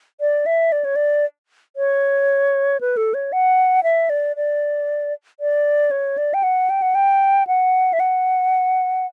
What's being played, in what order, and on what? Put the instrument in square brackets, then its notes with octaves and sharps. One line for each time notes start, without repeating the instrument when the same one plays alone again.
[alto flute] D5
E5
D5
C#5
D5
C#5
B4
A4
C#5
F#5
E5
D5
D5
D5
C#5
D5
G5
F#5
G5
F#5
G5
F#5
E5
F#5